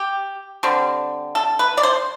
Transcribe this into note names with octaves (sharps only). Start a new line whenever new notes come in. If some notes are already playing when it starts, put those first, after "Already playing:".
Already playing: G4
D3 G3 C4
A4
B4
D5
C5